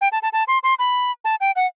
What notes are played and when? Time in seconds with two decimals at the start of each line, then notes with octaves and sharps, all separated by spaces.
0.01 G5
0.12 A5
0.23 A5
0.33 A5
0.48 C6
0.63 C6
0.79 B5
1.25 A5
1.41 G5
1.56 F#5